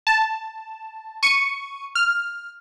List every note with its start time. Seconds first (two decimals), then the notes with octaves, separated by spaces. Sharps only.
0.07 A5
1.23 C#6 C#7 D#7
1.95 F6